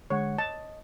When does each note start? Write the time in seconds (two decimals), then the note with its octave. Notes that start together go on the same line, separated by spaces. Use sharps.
0.10 D3 G#3 C#5 F#5
0.38 D#5 A5